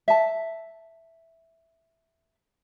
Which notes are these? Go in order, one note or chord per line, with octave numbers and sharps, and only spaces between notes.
E5 A5